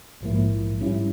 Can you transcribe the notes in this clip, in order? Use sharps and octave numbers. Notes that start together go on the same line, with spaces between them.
A#1 G#2 F3 A#3 E4
G#2 G3 C#4 E4